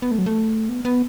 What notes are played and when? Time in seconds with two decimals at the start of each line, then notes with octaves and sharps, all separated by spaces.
0.02 B3
0.11 A3
0.18 F#3
0.26 A3
0.69 B3
0.85 B3